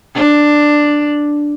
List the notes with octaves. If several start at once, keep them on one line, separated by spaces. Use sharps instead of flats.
D4